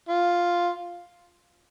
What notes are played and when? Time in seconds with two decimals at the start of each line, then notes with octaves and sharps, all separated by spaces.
0.09 F4